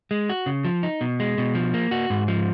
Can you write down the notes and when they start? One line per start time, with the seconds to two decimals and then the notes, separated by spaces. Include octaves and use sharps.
0.11 G#3
0.29 F#4
0.46 C#3
0.65 F3
0.83 D#4
1.01 B2
1.20 G#3
1.38 B2
1.55 F3
1.74 A#3
1.91 F#4
2.10 G#2
2.28 F3